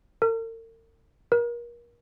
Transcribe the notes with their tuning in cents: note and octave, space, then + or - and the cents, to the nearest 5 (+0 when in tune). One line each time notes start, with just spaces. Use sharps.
A#4 -45
A#4 +35